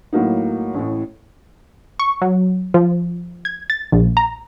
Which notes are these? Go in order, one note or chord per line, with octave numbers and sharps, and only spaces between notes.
A2 F#3 A#3 D#4
A1 A2
C#6
F#3
F3
G#6
A6
A#1
A#5